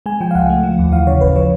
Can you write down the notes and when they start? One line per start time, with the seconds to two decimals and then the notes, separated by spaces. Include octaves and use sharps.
0.06 G#3 G#5
0.21 F3 G5
0.31 F5
0.35 C#2 F#5
0.50 A3
0.63 F3
0.79 D#2
0.92 E3 F5
1.07 C#3 C#5
1.21 G#1 B4
1.36 F3 C#5